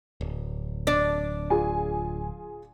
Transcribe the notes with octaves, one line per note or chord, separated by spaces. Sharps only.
D1
D4
F4 G#4 G#5